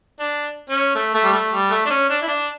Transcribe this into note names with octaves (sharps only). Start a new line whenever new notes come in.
D4
C#4
A3
A3
G3
A3
G3
A3
D4
C#4
D4
E4
D4